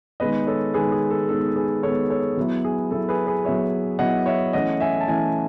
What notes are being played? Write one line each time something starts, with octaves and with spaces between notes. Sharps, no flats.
D#3 G#3 B3 B4 D#5
A4 C#5
D#3 G#3 B3 G#4 B4
G#4
A4
D#3 G#3 B3 A4
G#4 B4
D#3 G#3 B3 A4 C#5
A4 C#5
F#3 B3 E4
G#4
F#3 B3 E4 A4
G#4 B4
G#4 B4
F#3 B3 E4 C#5 E5
F#3 B3 E4 D#5 F#5
C#5 E5
E3 A3 C#4 E4 D#5 F#5
E5 G#5
A5
E3 A3 C#4 E4 E5 G#5